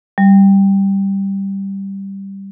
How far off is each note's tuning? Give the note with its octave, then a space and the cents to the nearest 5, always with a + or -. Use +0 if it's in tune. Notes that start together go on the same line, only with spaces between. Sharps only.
G3 +0